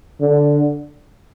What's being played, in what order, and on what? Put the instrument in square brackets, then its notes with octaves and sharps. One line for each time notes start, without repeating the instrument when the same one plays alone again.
[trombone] D3